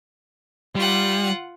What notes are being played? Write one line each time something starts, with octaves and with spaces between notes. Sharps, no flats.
G3 F4 F#5